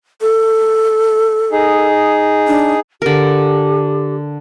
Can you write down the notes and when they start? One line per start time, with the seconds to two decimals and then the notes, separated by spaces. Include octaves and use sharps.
0.21 A4
1.52 D#4 G#4
2.48 D4
3.02 D3 G4 A#4